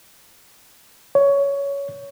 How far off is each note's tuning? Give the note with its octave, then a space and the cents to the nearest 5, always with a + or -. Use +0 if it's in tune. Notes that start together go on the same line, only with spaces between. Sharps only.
C#5 +15